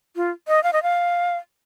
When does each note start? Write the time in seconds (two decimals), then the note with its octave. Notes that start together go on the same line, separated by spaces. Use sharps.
0.16 F4
0.48 D#5
0.63 F5
0.73 D#5
0.83 F5